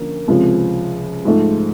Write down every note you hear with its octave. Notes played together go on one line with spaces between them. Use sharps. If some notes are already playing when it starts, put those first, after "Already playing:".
Already playing: D3 F3 A#3 C#4
C#2 C3 F3
G#2 F3 A3